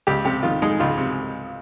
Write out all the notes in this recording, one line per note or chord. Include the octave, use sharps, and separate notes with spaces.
C#2 G4
C3 G4
D#3 F4
G#3 D#4
C#2 F4
C3